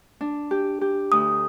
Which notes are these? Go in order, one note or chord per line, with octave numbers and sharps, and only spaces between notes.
D4
G4
G4
D2 D#6